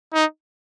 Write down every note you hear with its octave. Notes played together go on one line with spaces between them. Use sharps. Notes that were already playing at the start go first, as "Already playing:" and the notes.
D#4